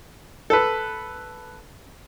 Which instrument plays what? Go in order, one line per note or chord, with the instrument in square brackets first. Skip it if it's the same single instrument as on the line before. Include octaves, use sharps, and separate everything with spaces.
[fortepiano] A4 B4